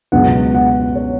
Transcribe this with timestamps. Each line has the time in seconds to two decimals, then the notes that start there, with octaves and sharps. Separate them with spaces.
0.12 C#2 B2 F#3 B3 F#5
0.54 F#5
0.95 C#5